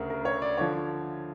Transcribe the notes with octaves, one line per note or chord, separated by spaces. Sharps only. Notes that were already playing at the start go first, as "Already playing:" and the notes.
Already playing: D2 C#3 A#4
A#4
C#5
D5
D3 F3 C#5